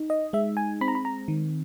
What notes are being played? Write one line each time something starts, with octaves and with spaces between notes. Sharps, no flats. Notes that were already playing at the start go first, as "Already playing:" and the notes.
Already playing: D#4
D#5
G#3 E5
G#5
C4 B5
A#5
B5
A#5
D#3